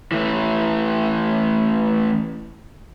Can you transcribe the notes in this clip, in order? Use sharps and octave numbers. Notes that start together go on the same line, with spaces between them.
E3 A3